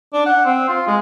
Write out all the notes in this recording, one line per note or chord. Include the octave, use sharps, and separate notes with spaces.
D4
F#5
C4
F4
G#3